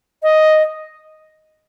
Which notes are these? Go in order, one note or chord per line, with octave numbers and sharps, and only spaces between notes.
D#5